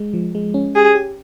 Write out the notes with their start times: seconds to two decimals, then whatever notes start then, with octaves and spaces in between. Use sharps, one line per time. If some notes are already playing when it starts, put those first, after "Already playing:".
Already playing: G#3
0.14 F3
0.35 G#3
0.54 C#4
0.75 G4 G#4
0.95 G4